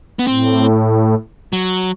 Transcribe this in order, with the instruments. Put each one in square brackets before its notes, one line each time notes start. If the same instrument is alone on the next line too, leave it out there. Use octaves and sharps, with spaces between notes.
[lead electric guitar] B3
[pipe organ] A2 [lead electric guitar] C4
[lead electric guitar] F#3